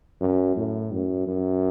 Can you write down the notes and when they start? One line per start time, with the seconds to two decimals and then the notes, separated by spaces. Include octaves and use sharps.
0.21 F#2
0.57 A2
0.92 F#2
1.28 F#2